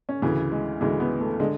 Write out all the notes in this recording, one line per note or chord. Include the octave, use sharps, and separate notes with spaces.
C#4
D2 C#3 E3
G#3
D2 C#3 E3 G#3
B3
A3
D3 G#3